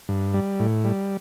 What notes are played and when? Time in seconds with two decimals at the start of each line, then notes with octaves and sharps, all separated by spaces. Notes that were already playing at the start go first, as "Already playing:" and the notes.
0.09 G2
0.34 G3
0.60 A2
0.84 G3